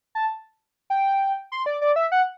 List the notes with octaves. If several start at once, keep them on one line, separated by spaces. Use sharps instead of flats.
A5
G5
C6
D5
D5
E5
F#5